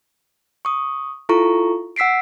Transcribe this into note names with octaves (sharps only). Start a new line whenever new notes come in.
C#6 D#6
E4 F4 A4 A#5 C#6
F#5 E6 B6 C7 D7